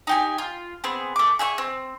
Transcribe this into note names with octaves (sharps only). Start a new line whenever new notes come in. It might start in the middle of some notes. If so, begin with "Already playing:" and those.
D#4 G4 G#5
F4
B3 C4 G#4
A3 D6
G#4 E5 G5 C#6
C4